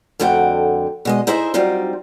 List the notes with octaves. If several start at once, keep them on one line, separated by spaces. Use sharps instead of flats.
F2 D3 A3 F#4 G5
B2 G#3 D#5
D#4 E4 G#4 C5 D#5 E5
F#3 G3 C4 D#4 F4